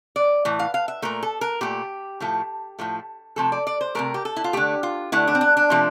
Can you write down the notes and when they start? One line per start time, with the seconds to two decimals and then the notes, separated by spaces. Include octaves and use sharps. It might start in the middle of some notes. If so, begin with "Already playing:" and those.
0.16 D5
0.45 A2 E3
0.59 F5
0.74 F5
0.88 E5
1.02 A#2 A3 A#4
1.23 A4
1.41 A#4
1.61 A#2 A3 G4
2.20 A2 F3 A3
2.79 A2 F3 A3
3.36 C3 F3 A3 A4
3.52 D5
3.67 D5
3.81 C5
3.95 C3 F3 A3 A#4
4.14 G4
4.25 A4
4.36 E4
4.44 F4
4.53 D3 A3 G4
4.83 F4
5.12 D3 A3 E4
5.28 D4
5.35 C4
5.41 D4
5.57 D4
5.70 C3 F3 A3